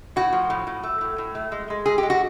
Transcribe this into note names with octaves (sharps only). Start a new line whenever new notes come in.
A2 F#4
F3
A2
A2
A3
A2
A2
A3
G#3
G#3
G#3 G#4
G4
G#3
F#4